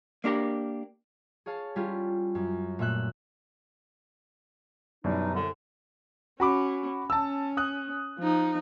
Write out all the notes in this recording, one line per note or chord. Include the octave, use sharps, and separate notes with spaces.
A#3 D4 G4 A#4
G#4 C#5 F5 A5
G3 C#4 E4 F4 G4
F#2
A#2 A3 E5 F#6
F#2 B2 E3 G3 D4 D#4
C2 D3
C#4 F#4 B5 D6
C#4 A5 E6
D#6 F#6
F3 D#4